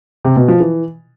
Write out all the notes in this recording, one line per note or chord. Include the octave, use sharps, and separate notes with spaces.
C3
B2
F3
E3